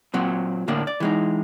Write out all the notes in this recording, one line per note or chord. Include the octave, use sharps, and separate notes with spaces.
A#2 F#3 C4
A2 D3 A#3 D4
D5
E3 G#3 D#4